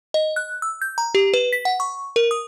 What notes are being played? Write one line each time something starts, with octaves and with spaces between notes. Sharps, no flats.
D#5
F#6
E6
G6
A#5
G4
B4
B6
F#5
C#6
A#4
D#6